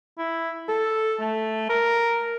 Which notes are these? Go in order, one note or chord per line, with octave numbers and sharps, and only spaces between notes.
E4
A4
A3
A#4